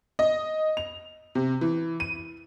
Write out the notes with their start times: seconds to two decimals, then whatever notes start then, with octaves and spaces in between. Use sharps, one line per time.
0.19 D#5
0.77 F7
1.35 C3
1.61 E3
2.00 D#7